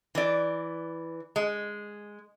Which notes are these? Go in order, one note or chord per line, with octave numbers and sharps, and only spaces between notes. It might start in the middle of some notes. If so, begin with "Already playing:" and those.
E3 D5
G#3